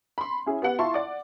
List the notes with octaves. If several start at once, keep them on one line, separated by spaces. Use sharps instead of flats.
B5 C6
C#4 E4 G#4
B3 G4 F#5
E4 F4 E5 A5 C6 C#6
D5 F#5 D6